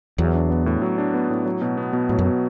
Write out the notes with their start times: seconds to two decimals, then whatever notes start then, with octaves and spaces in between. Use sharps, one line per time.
0.18 E2 F#3
0.35 D4
0.50 B3
0.66 A2
0.82 F#3
0.98 D4
1.14 B3
1.30 A2
1.46 F#3
1.62 B2
1.77 B3
1.93 B2
2.09 A2 F#3
2.19 F#2
2.25 B2